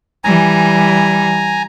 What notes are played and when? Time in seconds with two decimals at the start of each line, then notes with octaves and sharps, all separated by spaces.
0.24 E3 G3 G#5 A#5